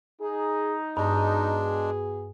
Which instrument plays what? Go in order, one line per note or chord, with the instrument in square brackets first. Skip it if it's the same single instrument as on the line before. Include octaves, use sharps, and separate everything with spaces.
[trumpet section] D#4 [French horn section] G#4
[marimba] G2 [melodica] G#3 D4 [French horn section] B3 F#4 G#4